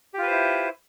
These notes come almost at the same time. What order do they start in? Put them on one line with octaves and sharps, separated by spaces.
G4 F4 B4 C5 E4